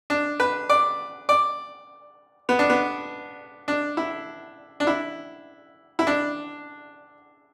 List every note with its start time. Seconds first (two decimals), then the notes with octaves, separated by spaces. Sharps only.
0.10 D4
0.40 B4
0.69 D5
1.29 D5
2.49 B3
2.59 D4
2.70 B3
3.68 D4
3.97 E4
4.80 D4
4.87 E4
5.99 E4
6.07 D4